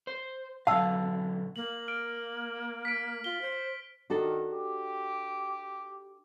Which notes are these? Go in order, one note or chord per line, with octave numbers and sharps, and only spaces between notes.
C5
B2 D3 F#3 F5 A5 E6
A#3 F#7
F6 D7
B6 D7
F4 G7
C5
D#3 D4 F#4 A4
G4